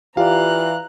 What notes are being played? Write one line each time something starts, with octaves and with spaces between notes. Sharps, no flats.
E3 F4 G4 D5 F5 A#5 F#6